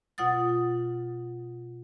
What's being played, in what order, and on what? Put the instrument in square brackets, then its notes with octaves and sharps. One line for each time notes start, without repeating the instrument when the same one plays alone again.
[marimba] B2 F4 F#5 D#6 A6